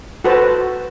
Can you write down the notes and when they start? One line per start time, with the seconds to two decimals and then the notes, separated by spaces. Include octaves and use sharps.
0.24 F#4 A4 B4 C5 A5